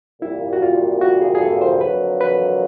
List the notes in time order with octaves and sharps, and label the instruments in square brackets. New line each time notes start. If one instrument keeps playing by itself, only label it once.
[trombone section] C2 A#2 G3 A#3 [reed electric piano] E4
[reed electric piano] F#4
F4
F#4
G#4
G#4
A4
C5
[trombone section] F2 D3 F#3 A#3 [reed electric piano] B4
[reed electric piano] B4